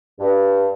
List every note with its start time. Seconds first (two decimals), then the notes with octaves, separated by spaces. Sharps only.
0.20 G2